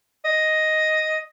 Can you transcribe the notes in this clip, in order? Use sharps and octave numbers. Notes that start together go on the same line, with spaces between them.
D#5